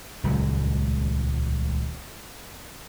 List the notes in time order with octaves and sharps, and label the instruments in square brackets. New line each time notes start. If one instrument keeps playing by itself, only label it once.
[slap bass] D#1 C#2 F#3 G#3